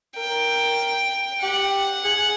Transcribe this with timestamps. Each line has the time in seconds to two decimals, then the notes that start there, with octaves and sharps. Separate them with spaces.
0.17 A#4 G5
1.42 G4 F#5
2.05 G#4